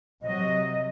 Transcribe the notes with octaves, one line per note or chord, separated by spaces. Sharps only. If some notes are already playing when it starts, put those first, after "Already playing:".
C3 F#3 D#5